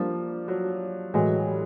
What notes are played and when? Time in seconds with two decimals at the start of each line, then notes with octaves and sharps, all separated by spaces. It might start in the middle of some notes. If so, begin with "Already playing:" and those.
Already playing: F3 G3 A#3 D4
0.48 F#3
1.14 A2 E3 F#3 G#3
1.47 G3